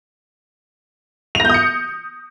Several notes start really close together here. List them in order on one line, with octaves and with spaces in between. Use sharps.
F7 A#6 G6 D#6 C#7